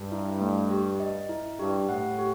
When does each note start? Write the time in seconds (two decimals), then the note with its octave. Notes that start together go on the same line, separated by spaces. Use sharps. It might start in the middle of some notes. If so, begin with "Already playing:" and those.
Already playing: G2
0.12 E4
0.41 A3
0.71 G4
1.00 D#5
1.29 E4
1.59 G2 G4
1.89 A2 F#5
2.19 G4